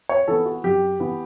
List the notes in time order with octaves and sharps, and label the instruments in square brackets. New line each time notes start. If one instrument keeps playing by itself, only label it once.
[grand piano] C#5
E3 B3 A4
F#4
F#2 G4
E3 B3